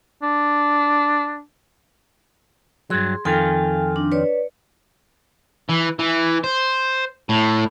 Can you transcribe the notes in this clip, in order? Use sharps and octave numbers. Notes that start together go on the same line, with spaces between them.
D4
G2 F#3 G#4 C6
F2 D#3 F4 A4 G5 G#5
D4
B4 C#5 D5
E3
E3
C5
A2